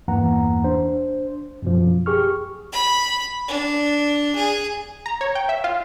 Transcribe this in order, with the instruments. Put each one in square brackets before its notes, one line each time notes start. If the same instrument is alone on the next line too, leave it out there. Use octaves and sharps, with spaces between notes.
[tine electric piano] E2 G2 E3 A#3 F#5 A#5
D4 C5
F#2 B2 F3
G4 G#4 C#6 F6
[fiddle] B5
D4
G#4
[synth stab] A#5
C#5
G5
E5
F4